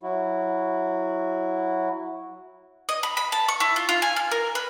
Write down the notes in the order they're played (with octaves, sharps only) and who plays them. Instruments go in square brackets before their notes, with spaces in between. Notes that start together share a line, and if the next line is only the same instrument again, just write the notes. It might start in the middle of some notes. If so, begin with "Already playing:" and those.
[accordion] F#3 E4 F#4
[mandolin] D#5
B5
B5
A5
C#6
E4
F4
F4
G#5
F6
A#4
B4